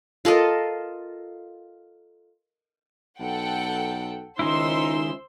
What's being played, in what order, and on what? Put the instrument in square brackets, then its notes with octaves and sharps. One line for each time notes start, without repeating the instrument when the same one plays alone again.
[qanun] F4 A4 A#4 D#5
[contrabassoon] B1 [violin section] A4 F#5 G5
[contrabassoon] C#2 [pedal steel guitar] D#3 G#3 E4 [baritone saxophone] D#4 [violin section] C5 C6 E6